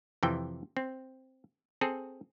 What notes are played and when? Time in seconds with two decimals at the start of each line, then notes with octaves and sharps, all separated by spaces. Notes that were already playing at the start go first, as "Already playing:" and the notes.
0.23 F2 C3 E3 G5
0.77 C4
1.81 C4 G#4 A4